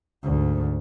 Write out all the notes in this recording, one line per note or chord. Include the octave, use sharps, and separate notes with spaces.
D2 G#2